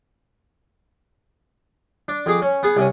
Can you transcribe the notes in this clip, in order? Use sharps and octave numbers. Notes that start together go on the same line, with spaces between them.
D4
F2 G#4 D6
C#4
B3 G#4
C2 C#4 D#6